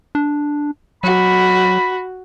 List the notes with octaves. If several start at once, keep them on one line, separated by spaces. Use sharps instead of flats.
D4
F#3 F#4 B5